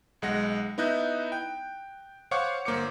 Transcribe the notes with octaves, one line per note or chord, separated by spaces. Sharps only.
B1 G#3 F#5 A#6
B3 D#4 E4 D#5 F#6 G6
G5
C5 C#5 F5 F#5 C#6 D6
G1 A#3 C5 D6 C#7